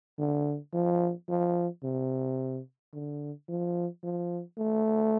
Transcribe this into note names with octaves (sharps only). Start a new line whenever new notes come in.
D3
F3
F3
C3
D3
F3
F3
A3